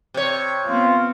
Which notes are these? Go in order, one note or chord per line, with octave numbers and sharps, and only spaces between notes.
C3 C#5
B3 C4 F4